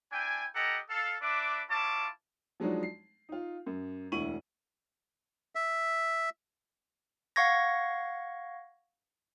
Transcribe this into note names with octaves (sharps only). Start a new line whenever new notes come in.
D4 E4 G5 G#5
G4 A4 D#5 F#5 A#5
A4 F5
D4 B4 E5 D6
C#4 E4 F4 A5 D6
F3 F#3 G#3 D4 D#4 F#4
C7
D#4 F4
F#2
E1 D2 E4 C#6 D#7 F#7
E5
F5 F#5 C#6 G#6 A#6